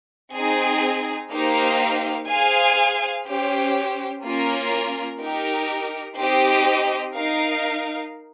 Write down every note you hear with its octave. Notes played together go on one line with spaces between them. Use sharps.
C4 D#4 G#4
A#3 D#4 G4 C5 F5
G#4 C5 F5 G#5
C#4 G4 C5
A#3 C#4 F4 A#4
D#4 G4 A#4
C4 D#4 G4 C5 D#5
D#4 A#4 F5